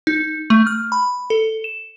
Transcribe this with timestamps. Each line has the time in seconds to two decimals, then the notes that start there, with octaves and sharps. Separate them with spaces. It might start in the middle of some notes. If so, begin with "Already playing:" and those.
0.07 D#4
0.50 A3
0.67 F6
0.92 B5
1.30 A4
1.64 E7